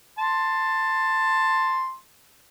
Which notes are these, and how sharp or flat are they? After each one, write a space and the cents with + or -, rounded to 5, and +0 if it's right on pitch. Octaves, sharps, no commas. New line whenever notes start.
A5 +10 C6 +0